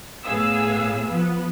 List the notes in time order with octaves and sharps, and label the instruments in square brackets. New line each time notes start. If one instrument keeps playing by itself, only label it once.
[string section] A2 B3 G#4 F5 E6
F3 B3